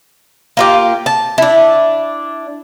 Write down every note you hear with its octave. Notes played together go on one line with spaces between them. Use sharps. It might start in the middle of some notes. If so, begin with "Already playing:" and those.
A#3 F4 G4
A5
D4 E4